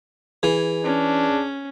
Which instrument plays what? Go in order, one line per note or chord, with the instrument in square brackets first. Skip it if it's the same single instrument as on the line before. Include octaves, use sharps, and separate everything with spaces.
[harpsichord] E3 [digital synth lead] G#4
[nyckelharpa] C#4 [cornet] D4